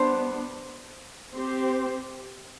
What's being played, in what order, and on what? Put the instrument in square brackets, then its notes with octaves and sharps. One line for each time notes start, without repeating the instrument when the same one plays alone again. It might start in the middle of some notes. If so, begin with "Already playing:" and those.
Already playing: [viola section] G3 B3 D4 [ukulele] C5
[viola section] C4 G4 C5